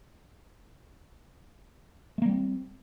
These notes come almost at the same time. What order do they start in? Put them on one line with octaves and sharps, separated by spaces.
A3 A#3 G3 C4